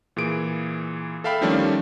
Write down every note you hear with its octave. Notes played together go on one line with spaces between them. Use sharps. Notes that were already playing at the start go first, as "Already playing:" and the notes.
A#2 E3 G#4 D7
A4 E5 F5 G5 B5
D#3 F3 G3 A3 C#4 D4